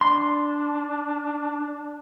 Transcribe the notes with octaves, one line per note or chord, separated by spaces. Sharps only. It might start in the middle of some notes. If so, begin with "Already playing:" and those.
D4 C6